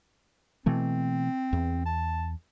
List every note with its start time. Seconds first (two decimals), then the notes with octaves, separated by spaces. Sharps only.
0.66 B2 E3 A3 C4
1.53 E2
1.85 A5